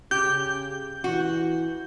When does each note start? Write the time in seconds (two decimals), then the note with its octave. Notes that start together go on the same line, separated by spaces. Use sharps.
0.11 C#3 G4 G6
1.04 E3 F#4